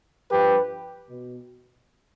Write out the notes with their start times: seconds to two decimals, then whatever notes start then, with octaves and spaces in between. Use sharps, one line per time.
0.30 G2 F3 G4 B4
1.10 B2